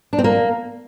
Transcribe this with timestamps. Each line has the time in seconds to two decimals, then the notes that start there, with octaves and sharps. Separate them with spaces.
0.13 D4
0.19 C4
0.24 A#3